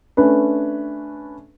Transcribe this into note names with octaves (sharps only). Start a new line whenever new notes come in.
A3 C#4 D4 B4